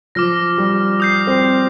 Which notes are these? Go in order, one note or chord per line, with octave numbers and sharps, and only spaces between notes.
F3 D6 F6 A#6
G3
D#6 G6 C7
C4